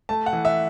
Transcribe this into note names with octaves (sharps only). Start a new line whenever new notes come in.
A3 A5
F#5
E3
E5